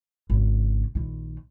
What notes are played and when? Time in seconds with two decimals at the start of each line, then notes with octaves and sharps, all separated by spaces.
0.30 G#1 C#3
0.95 A#1 D#3